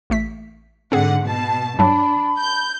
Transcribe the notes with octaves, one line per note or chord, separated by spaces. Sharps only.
A1 A3 B6
G#2 D3 C4 G#4 F#5
B2 A5
G2 F#3 D4 A5 B5
G6